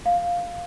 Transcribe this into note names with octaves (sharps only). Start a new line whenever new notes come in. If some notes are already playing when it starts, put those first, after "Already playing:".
F5